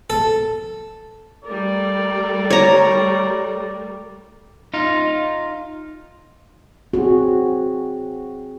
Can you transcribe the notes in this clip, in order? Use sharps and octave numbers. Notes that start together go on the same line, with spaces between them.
A4
G3 A3 A#4 D5
C#5 A#5
D#4 F4
C4 F#4 G#4